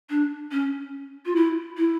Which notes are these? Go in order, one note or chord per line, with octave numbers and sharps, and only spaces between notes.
D4
C#4
F4
E4
E4